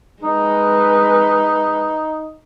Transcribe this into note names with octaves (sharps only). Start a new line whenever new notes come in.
G#3 D#4 B4